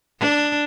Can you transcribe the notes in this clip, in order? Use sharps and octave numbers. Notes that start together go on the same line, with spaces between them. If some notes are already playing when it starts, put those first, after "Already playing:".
D4